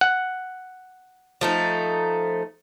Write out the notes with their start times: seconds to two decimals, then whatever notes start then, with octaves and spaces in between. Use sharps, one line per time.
0.01 F#5
1.41 F3 A3 D#4